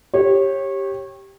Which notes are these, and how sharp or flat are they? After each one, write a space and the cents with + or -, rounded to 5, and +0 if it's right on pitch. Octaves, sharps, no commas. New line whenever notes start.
G4 +0 C#5 -25